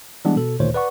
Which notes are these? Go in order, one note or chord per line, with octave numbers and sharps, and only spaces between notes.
E3 G3 G#3 B3 D4
B2 A4
G#1 D2 A#2 D#3 C5 C#5
B4 D5 F#5 C#6